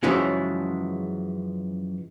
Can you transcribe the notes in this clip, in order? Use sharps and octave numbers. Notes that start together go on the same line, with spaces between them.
F#2 C#3 E3 F3 G#3 C#4